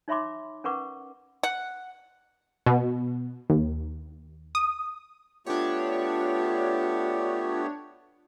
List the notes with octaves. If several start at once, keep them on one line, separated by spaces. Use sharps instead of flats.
D#4 C#5 E5 B5 C6 D6
C#4 A#4 B4 F#5 C#6 D6
F#5
B2
D#2
D#6
A3 B3 D4 F4 G4 C#5